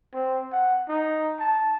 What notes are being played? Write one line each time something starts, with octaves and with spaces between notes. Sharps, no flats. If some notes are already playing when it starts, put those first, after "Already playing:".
C4
F#5
D#4
A5